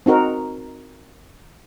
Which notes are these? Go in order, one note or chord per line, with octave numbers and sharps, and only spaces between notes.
C4 D#4 F#4 A#4